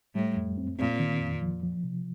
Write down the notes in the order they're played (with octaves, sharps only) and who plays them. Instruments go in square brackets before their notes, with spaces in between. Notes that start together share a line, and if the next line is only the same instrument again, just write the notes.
[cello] A2 [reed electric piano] G3
[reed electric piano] F2
C4
[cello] A#2 [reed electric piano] C4
[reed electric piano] D#3
F2
F3
F3
C3